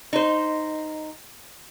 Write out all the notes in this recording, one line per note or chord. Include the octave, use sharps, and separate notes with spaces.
D#4 C5